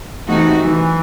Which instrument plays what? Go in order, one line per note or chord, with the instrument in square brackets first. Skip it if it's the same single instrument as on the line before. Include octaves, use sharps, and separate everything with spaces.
[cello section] C3 E3 A3 D#4 F#4
[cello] E3